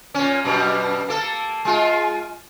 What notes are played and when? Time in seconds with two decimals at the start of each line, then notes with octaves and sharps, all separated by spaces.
0.14 A#2 C#4
0.44 F#2 B2 G3
1.08 A#3 A4
1.65 G#3 F4